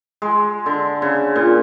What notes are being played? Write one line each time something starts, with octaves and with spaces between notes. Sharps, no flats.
G#3
D3
C#3
A#2